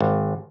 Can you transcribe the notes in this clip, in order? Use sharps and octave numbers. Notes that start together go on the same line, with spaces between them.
G#1